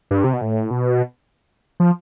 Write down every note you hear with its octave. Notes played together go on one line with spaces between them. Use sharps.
G2
C3
B2
A2
B2
F3